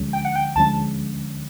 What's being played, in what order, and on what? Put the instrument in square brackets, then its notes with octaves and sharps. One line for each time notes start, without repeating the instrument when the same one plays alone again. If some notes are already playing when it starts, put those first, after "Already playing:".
Already playing: [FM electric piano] D2 D3 F3 G#3 C#4
[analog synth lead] G5
F#5
G5
[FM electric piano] D2 D3 F3 G#3 C#4 [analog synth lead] A5